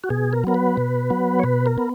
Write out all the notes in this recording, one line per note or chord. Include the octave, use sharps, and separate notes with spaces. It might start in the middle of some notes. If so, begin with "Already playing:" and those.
F#4
B2 G#4
A#4
F#3 B3 A#4
B4
B2
F#3 B3
C#5
B2 B4
A#4
B3